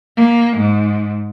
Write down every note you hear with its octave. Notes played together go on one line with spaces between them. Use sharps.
A#3
G#2